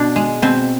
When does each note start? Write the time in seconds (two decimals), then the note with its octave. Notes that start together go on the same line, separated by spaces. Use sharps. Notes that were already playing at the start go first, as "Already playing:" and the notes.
Already playing: B2 D4
0.16 G#3
0.42 B2 C4